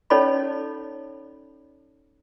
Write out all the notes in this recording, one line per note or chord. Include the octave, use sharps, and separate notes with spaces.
C#4 D#4 A4 C#5 D5 B5